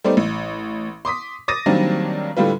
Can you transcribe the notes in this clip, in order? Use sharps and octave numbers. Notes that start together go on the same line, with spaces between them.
G3 A3 B3 D#4 C5 D5
A1
C6 D6 D#6 B6
D6 D#6 A6 A#6 D#7
D#3 F#3 G3 A#3 C4 D4
A2 D3 G3 F4 B4